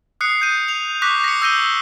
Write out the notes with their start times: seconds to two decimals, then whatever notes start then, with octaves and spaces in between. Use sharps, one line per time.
0.21 D#6 F#6 C7 C#7
0.41 G6 D#7
0.69 F7
1.02 C#6 D6 F#6 A#6 B6
1.24 A#6 C#7
1.42 E6 G6 A#6 D#7 G7